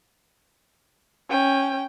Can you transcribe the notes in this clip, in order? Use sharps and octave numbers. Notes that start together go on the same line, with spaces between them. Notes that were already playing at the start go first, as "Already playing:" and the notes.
C#4 G5